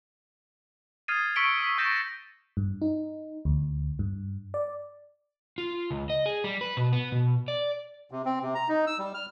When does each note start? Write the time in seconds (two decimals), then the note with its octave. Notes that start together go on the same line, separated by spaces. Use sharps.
1.08 D#6 F6 G#6 A6 C7 D#7
1.36 C#6 E6 B6 C#7 D7 G7
1.61 E6 B6
1.78 C#6 G6 A6 A#6 D7 E7
2.57 G2
2.82 D#4
3.45 D2
3.99 G2
4.54 D5
5.58 F4
5.91 C#2
6.10 D#5
6.26 G#4
6.44 G3
6.61 B4
6.77 B2
6.93 B3
7.12 B2
7.48 D5
8.11 C3
8.25 C4
8.43 C3
8.55 A#5
8.69 D#4
8.87 E6
8.99 G3
9.14 F6